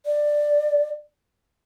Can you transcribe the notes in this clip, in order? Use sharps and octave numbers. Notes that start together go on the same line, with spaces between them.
D5